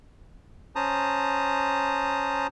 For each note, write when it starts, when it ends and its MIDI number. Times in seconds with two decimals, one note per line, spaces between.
0.75 2.47 61
0.75 2.47 72
0.75 2.47 81
0.75 2.47 82
0.75 2.47 87